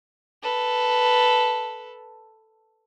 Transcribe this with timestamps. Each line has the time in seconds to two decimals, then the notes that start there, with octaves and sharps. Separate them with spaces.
0.43 A4 B4